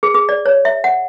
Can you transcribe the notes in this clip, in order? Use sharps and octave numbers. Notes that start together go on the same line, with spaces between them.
G#4
G#4
D5
C#5
E5
F#5